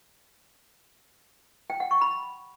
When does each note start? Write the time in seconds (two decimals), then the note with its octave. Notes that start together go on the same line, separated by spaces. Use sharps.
1.70 G5
1.80 F#5
1.91 C#6
2.01 B5